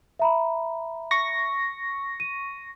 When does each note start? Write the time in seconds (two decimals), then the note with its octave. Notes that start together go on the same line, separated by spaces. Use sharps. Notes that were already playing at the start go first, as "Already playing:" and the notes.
0.19 E5 A#5 B5
1.11 C#6 A#6
2.20 D#7